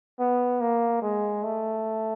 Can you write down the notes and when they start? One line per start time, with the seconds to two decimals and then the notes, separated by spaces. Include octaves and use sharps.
0.20 B3
0.61 A#3
1.02 G#3
1.43 A3